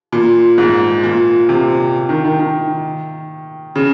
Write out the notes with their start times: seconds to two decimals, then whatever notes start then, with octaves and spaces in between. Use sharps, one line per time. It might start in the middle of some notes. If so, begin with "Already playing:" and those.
0.12 A#2
0.58 G#2
1.03 A#2
1.49 C3
2.09 D#3
2.24 D#3
2.39 D#3
3.75 C#3